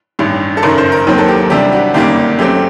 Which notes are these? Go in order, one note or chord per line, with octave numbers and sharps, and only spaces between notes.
A1 G2 D#3
A4
F#1 F#2 D#3 A#4
C5
A#4
D#2 D#3 F#3 C4 A#4
A4
G4
C2 C3 G3 D4 G4
F#4
G1 F#2 D#3 G3 A#3 G4
F#2 F#3 A3 C4 G4